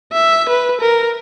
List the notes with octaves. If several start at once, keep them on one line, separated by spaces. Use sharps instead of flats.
E5
B4
A#4